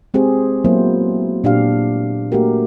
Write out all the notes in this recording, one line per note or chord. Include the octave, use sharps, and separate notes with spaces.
G#3 C4 G4 G#4 C5
F#3 A#3 B3 E4 C5
A#2 D4 G4 F5
A3 A#3 F#4 G4 A#4